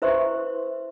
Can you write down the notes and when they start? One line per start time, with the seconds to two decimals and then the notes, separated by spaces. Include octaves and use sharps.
0.02 E4 B4 C5 E5 C6 C#6